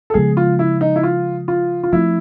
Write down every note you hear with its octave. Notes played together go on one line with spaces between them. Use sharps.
A4
C#3 F3 G#3 B3 G#4
F4
E4
D#4
E4
F4
F4
F4
F3 A3 C4 E4